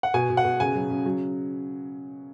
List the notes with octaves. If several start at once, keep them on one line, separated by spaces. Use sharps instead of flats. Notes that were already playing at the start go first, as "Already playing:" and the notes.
F#5
B2 G#5
B2
F#5
B2
C#3 G#5
F#3
C#3
F#3